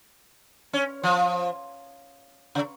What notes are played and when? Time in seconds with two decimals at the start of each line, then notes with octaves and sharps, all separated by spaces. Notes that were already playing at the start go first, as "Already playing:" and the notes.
0.73 C#4
1.03 F3
2.55 C#3